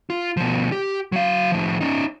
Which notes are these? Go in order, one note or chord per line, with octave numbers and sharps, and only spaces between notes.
F4
B2 F3
G4
F#3 F5
A2 F3
C#4 D#4